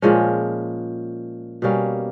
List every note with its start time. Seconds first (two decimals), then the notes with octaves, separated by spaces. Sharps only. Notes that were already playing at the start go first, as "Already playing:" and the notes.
0.02 A#2 F3 G#3 C#4
1.62 B2 G3 A#3 C#4